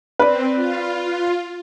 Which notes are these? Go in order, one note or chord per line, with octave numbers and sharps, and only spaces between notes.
C4 B4 D5
F4